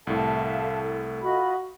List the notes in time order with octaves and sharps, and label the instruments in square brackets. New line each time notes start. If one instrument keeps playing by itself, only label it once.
[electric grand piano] C2 A2 [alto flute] A4 [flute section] E5 F5 A5
[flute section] F4 D#5 B5 [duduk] F#4